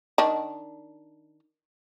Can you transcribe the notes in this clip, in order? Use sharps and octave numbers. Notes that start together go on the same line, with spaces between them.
D#3 D4